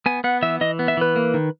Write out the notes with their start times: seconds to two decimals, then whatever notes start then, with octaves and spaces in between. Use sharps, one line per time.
0.06 B3 G#5
0.24 B3 F#5
0.42 E3 E5
0.61 E3 D#5
0.79 B3
0.88 E5
0.97 E3 B4
1.16 A#3
1.34 D#3